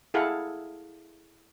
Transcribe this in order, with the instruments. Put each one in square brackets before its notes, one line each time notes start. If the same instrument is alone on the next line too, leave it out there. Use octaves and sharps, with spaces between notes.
[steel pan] E4 G#4 A4 F5 F#5